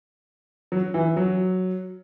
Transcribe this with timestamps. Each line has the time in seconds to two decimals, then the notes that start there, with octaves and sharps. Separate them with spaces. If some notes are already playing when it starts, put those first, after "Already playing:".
0.72 F#3
0.94 E3
1.17 F#3